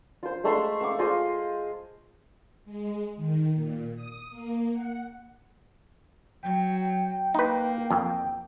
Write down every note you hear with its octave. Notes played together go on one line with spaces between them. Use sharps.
F4 C5
G#3 A3 E5 C6
F5 C#6 D6
F4 G#4 C5 D#5
G#3
D#3
A#2
D#6
A#3
F#5
F#3 G5
A#3 D#4 B4
F2